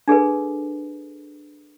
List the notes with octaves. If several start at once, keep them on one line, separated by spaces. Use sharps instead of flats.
D4 G#4 A4 B4